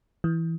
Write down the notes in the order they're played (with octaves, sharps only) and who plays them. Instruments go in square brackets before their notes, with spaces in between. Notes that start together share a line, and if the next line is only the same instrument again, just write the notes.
[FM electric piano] E3